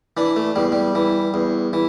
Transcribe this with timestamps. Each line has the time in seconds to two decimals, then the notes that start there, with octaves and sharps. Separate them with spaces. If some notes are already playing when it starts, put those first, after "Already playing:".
0.17 E3 D4
0.36 A3
0.56 E2 G3
0.72 G3
0.95 E3
1.34 E2
1.73 E3